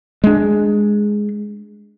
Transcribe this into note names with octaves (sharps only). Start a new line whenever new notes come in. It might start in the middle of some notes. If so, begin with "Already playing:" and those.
G#3 D4